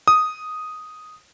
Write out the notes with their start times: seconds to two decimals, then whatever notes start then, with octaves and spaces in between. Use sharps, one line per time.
0.08 D#6